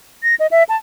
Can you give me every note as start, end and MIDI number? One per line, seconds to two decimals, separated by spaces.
0.23 0.35 94
0.40 0.47 75
0.51 0.63 76
0.69 0.76 81